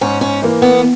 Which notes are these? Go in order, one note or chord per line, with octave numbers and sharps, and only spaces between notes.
G#2 C#4
C#4
E3 A#3
B3